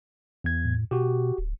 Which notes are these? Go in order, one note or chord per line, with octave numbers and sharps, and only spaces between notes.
E2 G#6
A2
B2 F#4 G4
D1